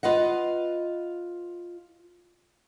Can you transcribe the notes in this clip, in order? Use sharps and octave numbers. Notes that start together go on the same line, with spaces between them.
F4 B4 D#5 F#5